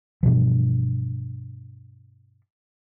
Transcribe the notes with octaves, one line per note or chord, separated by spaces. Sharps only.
G2 B2 E3 F3